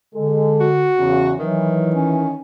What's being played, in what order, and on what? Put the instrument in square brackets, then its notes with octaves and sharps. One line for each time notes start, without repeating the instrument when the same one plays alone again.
[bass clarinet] D3 [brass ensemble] G#3 A4
[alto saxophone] F#4
[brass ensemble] E2 C#3
[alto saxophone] D#3 [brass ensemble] E3 [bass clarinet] F#3
[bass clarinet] C#4